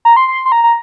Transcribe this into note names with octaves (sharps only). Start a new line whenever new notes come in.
A#5
C6
C6
C6
A#5
A#5